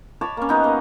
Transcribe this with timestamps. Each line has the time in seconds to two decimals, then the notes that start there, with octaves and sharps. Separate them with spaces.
0.21 C#5 A5 B5 D6
0.37 A#3 C#4
0.49 B3 D#4 F#4 F#5
0.64 A#3